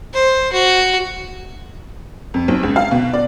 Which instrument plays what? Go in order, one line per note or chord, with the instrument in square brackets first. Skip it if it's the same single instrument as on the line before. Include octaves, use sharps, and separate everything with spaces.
[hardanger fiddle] C5
F#4
[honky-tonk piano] F2
B1
C#2
F5
B2
D5